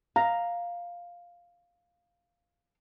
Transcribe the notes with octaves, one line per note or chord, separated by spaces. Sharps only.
F5 A#5